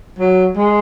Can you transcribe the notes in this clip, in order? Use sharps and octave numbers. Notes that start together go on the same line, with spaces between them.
F#3
G#3